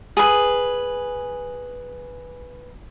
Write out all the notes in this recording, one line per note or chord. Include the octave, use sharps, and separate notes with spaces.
G#4 B4